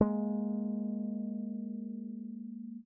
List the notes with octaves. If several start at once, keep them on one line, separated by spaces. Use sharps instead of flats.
G#3 A#3